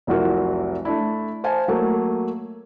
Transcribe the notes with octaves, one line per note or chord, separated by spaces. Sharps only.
F1 C2 F#3 F4 F#4 A#4
A3 D4 E4
C5 F5 G#5 A5
F#3 A3 A#3